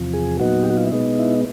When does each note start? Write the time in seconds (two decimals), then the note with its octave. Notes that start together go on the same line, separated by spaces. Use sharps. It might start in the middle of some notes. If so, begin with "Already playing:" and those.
Already playing: E2 C3 F3
0.14 G#4
0.40 A#2 F#3 B3 D#4 F#4
0.63 G4
0.70 F#4
0.77 F4
0.84 E4
0.92 B2 G#3 B3 D#4
1.19 E4